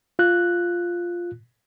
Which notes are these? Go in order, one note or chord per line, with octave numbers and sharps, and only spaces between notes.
F4 F#6